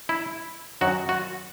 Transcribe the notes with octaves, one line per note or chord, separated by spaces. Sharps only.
E4
F#2 D#3 F#3 F#4
F#4